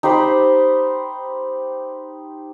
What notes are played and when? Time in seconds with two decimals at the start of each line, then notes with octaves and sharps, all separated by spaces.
0.03 D#4 G4 C5 B5